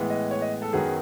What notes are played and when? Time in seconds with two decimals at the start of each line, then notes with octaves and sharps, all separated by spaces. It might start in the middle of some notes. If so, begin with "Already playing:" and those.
Already playing: A2 E3 G#3 B3
0.10 D#5
0.31 C#5
0.42 D#5
0.62 A4
0.73 F#2 D#3 F#3 B3 G#4